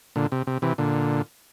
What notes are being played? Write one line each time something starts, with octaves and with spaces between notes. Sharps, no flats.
A#2 D3
C3
C3
C3 E3
A#2 D3